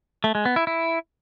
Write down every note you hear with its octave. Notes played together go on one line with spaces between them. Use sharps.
A3
G#3
B3
E4
E4